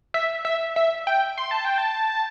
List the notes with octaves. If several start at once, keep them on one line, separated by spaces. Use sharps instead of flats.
E5
E5
E5
G5
C6
A5
G5
A5